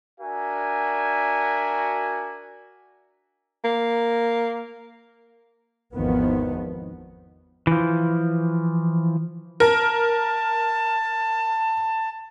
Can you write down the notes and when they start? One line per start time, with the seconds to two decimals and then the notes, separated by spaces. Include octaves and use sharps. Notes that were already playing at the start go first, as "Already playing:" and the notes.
0.19 D4 F#4 A#4 E5 G#5
3.65 A#3
5.94 G#1 E2 D#3 F3 B3
7.67 E3 F3
9.60 A#4 A5